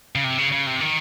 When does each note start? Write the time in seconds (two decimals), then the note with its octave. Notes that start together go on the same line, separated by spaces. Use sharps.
0.15 C#3
0.24 C3
0.38 C#3
0.52 C#3
0.67 C3
0.81 D#3